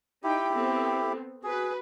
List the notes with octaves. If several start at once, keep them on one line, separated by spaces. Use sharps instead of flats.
D#4 E4 G4 G5
B3 C4 A4
F#4 G#4 B4